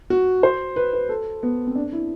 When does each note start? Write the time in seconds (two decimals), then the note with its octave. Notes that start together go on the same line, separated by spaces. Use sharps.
0.10 F#4
0.43 C5
0.76 B4
0.93 B4
1.09 A4
1.43 B3
1.67 C4
1.76 D4
1.93 E4